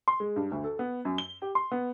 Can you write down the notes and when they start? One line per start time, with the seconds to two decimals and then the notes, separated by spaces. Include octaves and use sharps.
0.08 C6
0.20 G#3
0.36 G2
0.51 D2
0.64 A4
0.79 B3
1.05 F#2
1.18 G7
1.42 G4
1.55 C6
1.72 B3